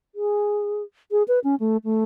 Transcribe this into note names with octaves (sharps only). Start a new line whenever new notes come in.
G#4
G#4
B4
C#4
A3
A3